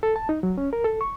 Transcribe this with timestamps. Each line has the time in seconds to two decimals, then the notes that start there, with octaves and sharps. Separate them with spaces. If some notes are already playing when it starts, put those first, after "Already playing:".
0.03 A4
0.16 A5
0.29 D#4
0.43 F#3
0.58 C#4
0.73 A#4
0.84 A4
1.01 C#6